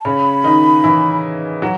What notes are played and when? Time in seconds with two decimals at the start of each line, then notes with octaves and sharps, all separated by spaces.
0.01 A5
0.05 C#3 C#4 B5
0.44 D#3 D#4
0.84 E3 E4
1.62 F#3 F#4